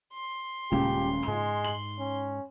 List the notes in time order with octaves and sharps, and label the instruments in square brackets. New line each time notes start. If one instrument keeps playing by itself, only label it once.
[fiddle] C6
[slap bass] D#1 G#3 C#4 [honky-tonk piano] A#2 C#3 [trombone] G4
[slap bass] G#2 [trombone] G#3
[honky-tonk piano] F#7
[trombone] C#4